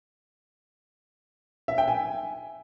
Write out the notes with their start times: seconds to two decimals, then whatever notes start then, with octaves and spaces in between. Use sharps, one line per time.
1.68 E5
1.78 G5
1.88 G#5